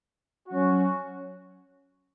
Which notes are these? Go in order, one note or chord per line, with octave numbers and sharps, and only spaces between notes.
F#3 C#4 F#4